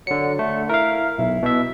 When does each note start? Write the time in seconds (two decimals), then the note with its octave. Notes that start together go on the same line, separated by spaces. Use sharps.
0.07 D3 F#3 C#7
0.39 D3 A3
0.69 E4 A#4 F5
1.19 B1 E4
1.42 B2 E5